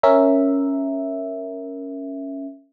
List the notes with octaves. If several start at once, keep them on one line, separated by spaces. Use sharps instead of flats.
C#4 A#4 E5